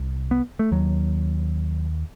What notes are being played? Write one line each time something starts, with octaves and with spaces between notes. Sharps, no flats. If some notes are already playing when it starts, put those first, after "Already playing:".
Already playing: C2 C3
B3
A3
D#2 F#3